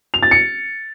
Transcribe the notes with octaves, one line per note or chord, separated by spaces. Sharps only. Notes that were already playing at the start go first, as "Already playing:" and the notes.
F7
A6
C#7